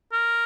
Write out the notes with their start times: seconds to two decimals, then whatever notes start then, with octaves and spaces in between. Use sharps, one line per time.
0.12 A#4